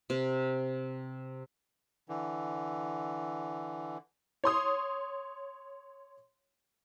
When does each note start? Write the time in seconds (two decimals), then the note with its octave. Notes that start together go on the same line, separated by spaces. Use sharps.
0.10 C3
2.09 D3 E3
4.44 C#5 C6 D#6